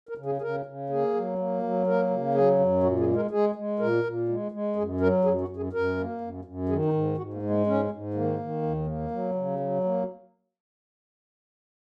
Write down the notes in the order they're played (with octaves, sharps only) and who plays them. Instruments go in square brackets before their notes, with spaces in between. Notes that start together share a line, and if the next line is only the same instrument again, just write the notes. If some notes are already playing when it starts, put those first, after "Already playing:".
[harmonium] A#4
C#3
G#4
G#4
C#3 A#4
C#3
A#3 G#4
F#3
A#3
F#3
A#3 A#4
C#3
F#3 G#4
F#2
A#2 F#4
G#4
G#3
A#4
G#3 G#4
G#3
A#2 A#4
A#2
G#3
G#3
F#2 G#4
F#3 A#4
F#2 G#4
F#4
F#2
G#4
F#2 A#4
A#3
F#2
F#2
D#3 G#4
D#4
G#2
G#2 F#4
A#3
G#3
A#3
G#2 C#4
G#2
D#3 A#3
D#3
D#2
A#3
F#3
C#3
F#3
A#3